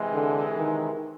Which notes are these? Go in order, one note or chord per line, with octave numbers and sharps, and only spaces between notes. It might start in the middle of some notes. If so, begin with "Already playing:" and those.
Already playing: C3 E3 G#3
D3
D#3